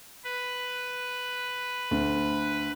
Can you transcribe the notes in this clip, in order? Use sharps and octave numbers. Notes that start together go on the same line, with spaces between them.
B4
D2